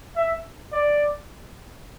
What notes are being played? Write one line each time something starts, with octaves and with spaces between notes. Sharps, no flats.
E5
D5